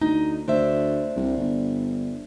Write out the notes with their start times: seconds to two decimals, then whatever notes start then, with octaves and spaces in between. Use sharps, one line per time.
0.01 D2 D#4
0.48 D2 D4 C5 E5
1.16 C2
1.37 G1